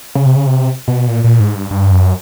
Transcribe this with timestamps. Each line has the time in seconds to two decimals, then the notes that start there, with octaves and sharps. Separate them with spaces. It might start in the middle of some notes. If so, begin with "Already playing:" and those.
0.15 C#3
0.26 C3
0.36 C#3
0.47 C3
0.88 B2
1.08 A#2
1.24 A#2
1.40 G#2
1.55 G2
1.71 G2
1.91 F#2